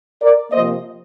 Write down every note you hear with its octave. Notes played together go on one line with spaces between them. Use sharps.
A#4 D5
C3 F3 A#3 C5 D#5